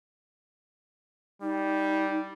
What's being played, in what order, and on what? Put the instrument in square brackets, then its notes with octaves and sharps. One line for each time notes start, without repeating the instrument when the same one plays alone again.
[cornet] G3 [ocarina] D#4